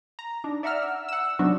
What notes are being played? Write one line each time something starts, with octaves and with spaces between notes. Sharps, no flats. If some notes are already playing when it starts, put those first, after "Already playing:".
A#5
D4 D#4
D5 E5 F#5 A#5 E6 F6
E6
F#5 E6
C3 F#3 B3 D4 D#4 F#4